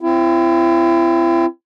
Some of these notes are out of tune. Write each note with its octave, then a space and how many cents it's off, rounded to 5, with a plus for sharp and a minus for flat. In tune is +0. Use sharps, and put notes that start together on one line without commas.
C4 +0 E4 +40